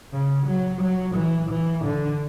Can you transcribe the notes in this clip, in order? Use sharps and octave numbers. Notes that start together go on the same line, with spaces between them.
C#3
F#3
F#3
E3
E3
D3